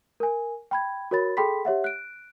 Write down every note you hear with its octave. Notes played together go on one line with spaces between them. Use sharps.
A#4 G#5
G5 B5 G#6
F#4 A#4 C#5 B5 A6
G#4 A4 G5 B5 C6 B6
G4 C#5 E5 F#5
F#6 D7